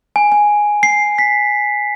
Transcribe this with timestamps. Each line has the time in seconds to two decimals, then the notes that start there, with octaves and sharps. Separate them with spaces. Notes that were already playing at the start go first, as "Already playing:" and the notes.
0.16 G#5
0.32 G#5
0.83 C7
1.18 B6